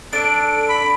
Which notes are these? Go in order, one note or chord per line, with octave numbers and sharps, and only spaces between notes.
D4 A4 D7
B5